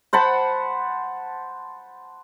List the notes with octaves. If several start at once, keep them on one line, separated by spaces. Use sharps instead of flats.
C5 F#5 A5 B5